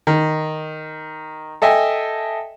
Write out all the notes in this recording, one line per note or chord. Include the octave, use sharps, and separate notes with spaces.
D#3
A4 D#5 E5 G5 G#5